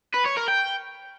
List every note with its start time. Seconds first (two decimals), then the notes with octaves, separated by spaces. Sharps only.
0.14 B4
0.25 C#5
0.37 A#4
0.48 G5